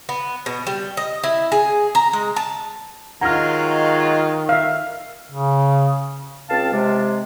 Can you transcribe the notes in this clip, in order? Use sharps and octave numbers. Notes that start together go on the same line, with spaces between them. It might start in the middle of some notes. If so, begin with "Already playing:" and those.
B3
B2
G3
D#5
E4
G#4
A#5
G#3
A5
D#3 F#3 G#3 F4 F#5 A#5 F6
E5 F5
C#3
C#2 C4 F5 A5
C3 G#3